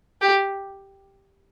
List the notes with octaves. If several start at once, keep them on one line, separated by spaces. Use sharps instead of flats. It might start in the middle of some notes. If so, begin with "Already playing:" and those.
G4